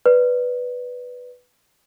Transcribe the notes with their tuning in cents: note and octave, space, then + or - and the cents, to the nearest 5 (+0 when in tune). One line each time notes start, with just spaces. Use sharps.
B4 +0 D5 +0